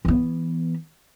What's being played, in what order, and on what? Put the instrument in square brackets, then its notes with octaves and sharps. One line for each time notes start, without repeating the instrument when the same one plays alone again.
[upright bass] E3 B3